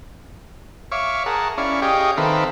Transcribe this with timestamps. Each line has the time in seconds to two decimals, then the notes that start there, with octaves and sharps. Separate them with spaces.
0.92 C#5 E5 F5 C#6 D6
1.26 G#4 A#4 F#5 A5
1.58 C#4 E4 D5 F5 C#6
1.82 G4 G#4 C#5 D#5 F5 G5
2.17 D#3 C4 A4 B4 E5 F5